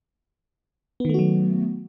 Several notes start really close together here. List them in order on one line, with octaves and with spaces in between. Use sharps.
B3 D#3 A3 F#4 F#3